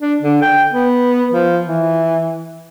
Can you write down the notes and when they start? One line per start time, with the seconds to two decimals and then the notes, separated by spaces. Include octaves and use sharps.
0.01 D4
0.22 D3
0.42 G5
0.72 B3
1.32 F3
1.65 E3